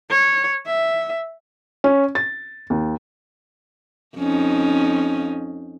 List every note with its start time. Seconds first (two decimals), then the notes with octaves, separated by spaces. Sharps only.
0.10 C#5
0.66 E5
1.84 C#4
2.15 A6
2.70 D#2
4.17 F2 C#4 D#4